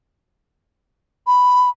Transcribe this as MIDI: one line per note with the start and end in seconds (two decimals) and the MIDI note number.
1.27 1.69 83